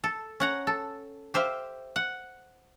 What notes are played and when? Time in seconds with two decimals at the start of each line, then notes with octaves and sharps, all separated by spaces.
0.04 A4
0.40 C#4 F#5 A#5
0.67 A4
1.34 G4 C5 E5 F5
1.96 F#5